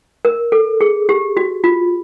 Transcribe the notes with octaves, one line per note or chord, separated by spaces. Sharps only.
A#4
A4
G#4
G4
F#4
F4